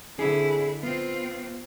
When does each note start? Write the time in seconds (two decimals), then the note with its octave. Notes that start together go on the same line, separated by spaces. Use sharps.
0.18 D3 C4 E4 G#4
0.83 B3 C4 F4